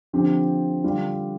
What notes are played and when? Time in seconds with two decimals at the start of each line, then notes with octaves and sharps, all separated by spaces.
0.13 D3 F3 C4 G4
0.84 D3 G3 D4 F4